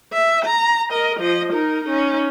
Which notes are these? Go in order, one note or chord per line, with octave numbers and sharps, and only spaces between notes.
E5
A#5
A#4 D#5
F3 D#5
D#4 A#4
C#4 D#4